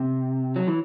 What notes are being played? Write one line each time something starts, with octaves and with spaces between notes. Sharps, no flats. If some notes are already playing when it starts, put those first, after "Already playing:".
Already playing: C3
F#3
E3